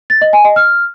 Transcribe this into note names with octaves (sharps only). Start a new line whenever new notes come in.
A6
D#5
G#5
D#5
F6